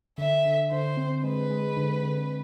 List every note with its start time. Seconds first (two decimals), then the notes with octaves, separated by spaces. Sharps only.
0.18 D3 E5
0.45 D3
0.71 D3 C5
0.97 C4
1.24 G#3 B4
1.50 G#3
1.77 D3
2.03 D3